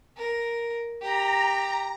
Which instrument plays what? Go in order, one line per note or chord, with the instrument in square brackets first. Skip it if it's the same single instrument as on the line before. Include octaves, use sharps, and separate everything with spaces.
[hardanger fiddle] A#4
[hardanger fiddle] G4 [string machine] A#5